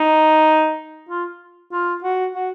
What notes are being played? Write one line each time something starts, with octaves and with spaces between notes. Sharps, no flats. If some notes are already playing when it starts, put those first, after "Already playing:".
Already playing: D#4
F4
F4
F#4
F#4